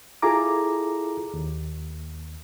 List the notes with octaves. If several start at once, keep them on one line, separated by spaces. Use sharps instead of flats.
E4 F4 G#4 A4 A#5 D6
D#2